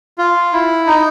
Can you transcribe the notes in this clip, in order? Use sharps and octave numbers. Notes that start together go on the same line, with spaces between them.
F4
E4
D#4